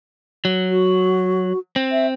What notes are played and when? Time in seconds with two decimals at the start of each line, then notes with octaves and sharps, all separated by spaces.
0.45 F#3
0.70 F#4
1.76 C4
1.92 E5